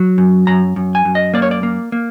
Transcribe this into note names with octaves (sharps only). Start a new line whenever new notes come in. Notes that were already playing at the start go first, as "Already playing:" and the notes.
Already playing: F#3
F#2
F#2 A#5
F#2
G#5
F#2
D#5
A#3 D5
C#5
D5
A#3
A#3